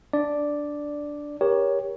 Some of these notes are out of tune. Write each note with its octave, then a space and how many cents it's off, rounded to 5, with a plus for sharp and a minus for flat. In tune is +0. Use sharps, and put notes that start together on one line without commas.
D4 -5 D5 +0
G4 +20 A#4 +25 C#5 +10